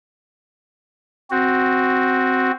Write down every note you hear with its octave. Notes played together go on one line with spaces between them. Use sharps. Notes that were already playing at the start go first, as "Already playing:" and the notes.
C4 F#4